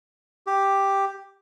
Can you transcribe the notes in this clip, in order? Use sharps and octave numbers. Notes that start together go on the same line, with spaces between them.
G4